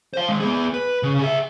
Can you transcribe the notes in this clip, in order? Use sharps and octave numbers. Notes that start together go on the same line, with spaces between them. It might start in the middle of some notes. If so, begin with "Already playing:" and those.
C5 F5
D#3 G#3
B3 G#4
B4
C#3
G#4 E5